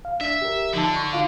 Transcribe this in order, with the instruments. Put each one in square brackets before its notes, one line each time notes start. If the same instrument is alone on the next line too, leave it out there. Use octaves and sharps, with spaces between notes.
[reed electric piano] F5
[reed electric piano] D4 [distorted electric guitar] E5
[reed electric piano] G4 A#4
[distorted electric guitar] D3 [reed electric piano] F3 D#4 A5
[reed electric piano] C#6
D#4 F4 F5